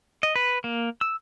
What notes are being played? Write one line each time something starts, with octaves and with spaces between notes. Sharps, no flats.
D#5
B4
A#3
E6